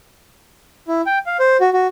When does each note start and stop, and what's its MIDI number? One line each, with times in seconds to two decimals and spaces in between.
0.88 1.01 64
1.06 1.19 79
1.26 1.37 77
1.39 1.57 72
1.61 1.70 66
1.73 1.87 66